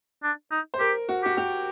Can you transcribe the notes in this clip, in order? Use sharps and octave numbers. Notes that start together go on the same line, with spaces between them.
D4
D#4
C5
G4 A#4
F#4
F#4 G4
G4